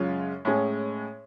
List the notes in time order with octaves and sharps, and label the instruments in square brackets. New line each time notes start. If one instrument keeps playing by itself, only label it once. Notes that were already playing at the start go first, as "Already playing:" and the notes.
Already playing: [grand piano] F#2 C#3 G#3 C#4 F4
A2 G#3 C#4 G#4